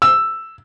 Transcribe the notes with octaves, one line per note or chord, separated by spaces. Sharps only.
E6